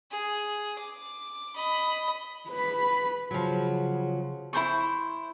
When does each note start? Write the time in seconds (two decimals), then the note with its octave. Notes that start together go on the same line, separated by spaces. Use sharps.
0.11 G#4
0.78 D6
1.56 D#5 B5
2.49 B4 B5
3.31 C#3 F3 F#3
4.53 E4 A4 C5 C#6